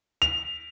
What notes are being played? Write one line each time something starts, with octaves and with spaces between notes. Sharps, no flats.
F7